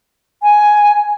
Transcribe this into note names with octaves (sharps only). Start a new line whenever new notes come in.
G#5